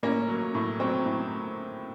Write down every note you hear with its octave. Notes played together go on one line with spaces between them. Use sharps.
A2 A#3 C#4
F#3
A2
F#3 C4
A2